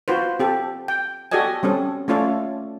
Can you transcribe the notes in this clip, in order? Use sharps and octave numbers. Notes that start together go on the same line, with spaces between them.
F4 F#4 B4 C5
C4 G4 A4
G5
F#4 G4 A4 D5 D#5 G#5
G3 C4 C#4 A4
A3 C#4 F4 A4 C#5 D5